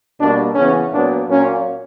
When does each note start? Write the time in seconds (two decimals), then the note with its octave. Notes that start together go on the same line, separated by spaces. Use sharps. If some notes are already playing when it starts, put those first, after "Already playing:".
0.18 B2 G3 A#3 D4
0.54 C#3 E3 B3 C#4
0.91 A#2 F#3 B3 D4
1.28 A#2 F#3 A#3 C#4